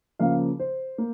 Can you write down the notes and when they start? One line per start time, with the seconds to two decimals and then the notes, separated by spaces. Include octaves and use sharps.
0.19 C#3 F3 A#3 F5
0.60 C5
0.98 A#3